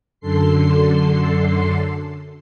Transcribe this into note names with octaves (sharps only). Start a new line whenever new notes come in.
F#2 D3 A4 C6 C7